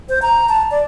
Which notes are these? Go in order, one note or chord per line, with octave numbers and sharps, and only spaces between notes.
C5
A#5
A5
D5